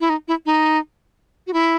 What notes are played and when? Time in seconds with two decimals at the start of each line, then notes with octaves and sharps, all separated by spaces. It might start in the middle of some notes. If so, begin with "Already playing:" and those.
0.01 E4
0.10 D#4
0.28 E4
0.46 D#4
1.47 F#4
1.53 E4